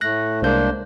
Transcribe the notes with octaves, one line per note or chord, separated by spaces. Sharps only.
A2 A3 F#6 A#6
C2 G#3 A#3 D4 C5 G6